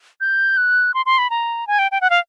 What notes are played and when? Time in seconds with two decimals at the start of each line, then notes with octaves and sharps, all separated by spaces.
0.21 G6
0.57 F#6
0.94 C6
1.06 C6
1.18 B5
1.30 A#5
1.67 G#5
1.79 G5
1.92 G5
2.01 F#5
2.10 F5